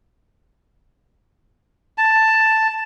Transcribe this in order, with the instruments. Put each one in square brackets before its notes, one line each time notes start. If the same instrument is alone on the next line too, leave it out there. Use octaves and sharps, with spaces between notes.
[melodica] A5